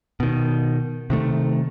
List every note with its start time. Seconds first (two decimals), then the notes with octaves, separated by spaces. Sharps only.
0.20 B2 D#3
1.10 C3 D#3 A3